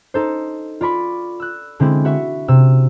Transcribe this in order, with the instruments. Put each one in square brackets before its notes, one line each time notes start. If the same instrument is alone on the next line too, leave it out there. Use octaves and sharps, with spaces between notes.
[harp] D#4 A4 C5
F4 D5 B5 C#6
E6 F#6
D3 G#3 C4 E4
F#4 E5 C#6
C3 E6